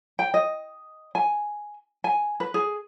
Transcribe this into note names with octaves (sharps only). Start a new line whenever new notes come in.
G5
D#5
G#5
G#5
B4
G#4